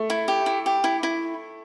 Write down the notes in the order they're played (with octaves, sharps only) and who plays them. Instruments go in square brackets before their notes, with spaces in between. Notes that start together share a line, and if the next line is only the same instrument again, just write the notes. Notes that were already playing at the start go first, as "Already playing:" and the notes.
Already playing: [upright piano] A3
[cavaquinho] E4
G4
E4
G4
E4
E4